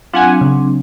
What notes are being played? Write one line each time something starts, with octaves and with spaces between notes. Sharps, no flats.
F#3 C4 D4 F4 F#5 G#5
C#3